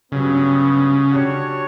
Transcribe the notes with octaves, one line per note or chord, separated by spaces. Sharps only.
G2 C#3 F#3 B3
G3 D4 F#4 C#5